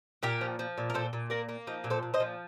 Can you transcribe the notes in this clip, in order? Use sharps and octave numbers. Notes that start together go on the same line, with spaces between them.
A#2 G4 A#4
F3
F3
A#2
A#4
A#2 A4 C5
A#2
A#3 A#4 D5
A#3
F3 D#4
A#2
A4 C5
A#2
C5 D#5
F3